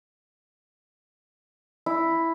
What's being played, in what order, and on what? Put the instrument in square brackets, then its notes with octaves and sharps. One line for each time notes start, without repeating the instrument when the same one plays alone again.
[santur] E4